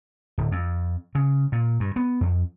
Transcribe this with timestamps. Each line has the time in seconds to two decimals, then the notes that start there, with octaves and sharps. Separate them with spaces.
0.38 D1
0.52 F2
1.15 C#3
1.52 A#2
1.80 G2
1.96 B3
2.21 F2